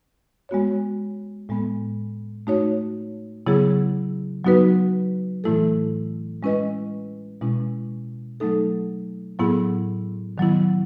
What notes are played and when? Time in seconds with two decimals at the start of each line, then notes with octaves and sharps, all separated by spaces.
0.49 G#3 B3 F#4 C#5
1.49 A2 G#3 B3
2.47 A3 D#4 F#4 C#5
3.46 C#3 F#3 B3 E4 G#4
4.44 F#3 B3 D#4 F#4 B4
5.44 A2 E3 A3 E4 A4
6.43 G#3 C#4 E4 B4 D#5
7.41 B2 G#3 C#4 E4
8.40 F#3 A3 D#4 A4
9.39 A2 F#3 B3 E4 G#4
10.38 D#3 F#3 B3 E4